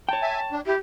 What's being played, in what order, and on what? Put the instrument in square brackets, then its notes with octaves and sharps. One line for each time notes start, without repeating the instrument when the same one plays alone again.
[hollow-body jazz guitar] C#5 G5 [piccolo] A5
[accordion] E5 G#5
D4
[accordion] E4 [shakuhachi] G4